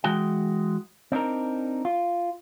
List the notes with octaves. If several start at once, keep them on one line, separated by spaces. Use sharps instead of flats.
E3 G#3 F#4 G5
C4 D4 D#4 A#4
F4